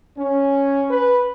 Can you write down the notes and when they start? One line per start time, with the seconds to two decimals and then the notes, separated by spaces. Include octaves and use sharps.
0.17 C#4
0.90 B4